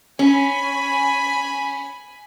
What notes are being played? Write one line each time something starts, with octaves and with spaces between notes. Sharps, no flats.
C#4 G#5 B5